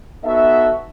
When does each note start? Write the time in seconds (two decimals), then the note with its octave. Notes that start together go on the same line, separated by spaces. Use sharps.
0.25 B3 D#4 F#4 A4 E5